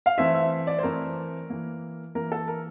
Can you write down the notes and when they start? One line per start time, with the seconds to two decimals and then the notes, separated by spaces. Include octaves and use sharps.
0.06 F5
0.18 E3 A3 C4 E5
0.34 E5
0.67 D5
0.78 C5
0.83 E3 A3 C4 A#4
1.50 E3 A#3
2.15 E3 A#3 A#4
2.32 A4
2.48 A#4